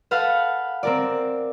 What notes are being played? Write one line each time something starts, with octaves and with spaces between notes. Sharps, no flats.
A4 B4 F5 F#5
C4 A#4 D5